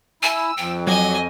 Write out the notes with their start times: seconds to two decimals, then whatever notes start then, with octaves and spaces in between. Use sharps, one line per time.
0.23 E4 G#5 E6
0.57 F2 G5
0.87 F#3 D#5 G#5 D6